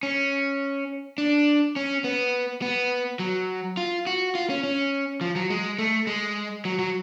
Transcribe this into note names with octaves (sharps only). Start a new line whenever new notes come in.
C#4
D4
C#4
B3
B3
F#3
F4
F#4
F4
C#4
C#4
F3
F#3
G#3
A3
G#3
F#3
F#3